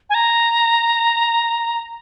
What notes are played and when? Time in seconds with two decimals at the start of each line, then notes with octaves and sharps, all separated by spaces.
0.10 G#5
0.14 A#5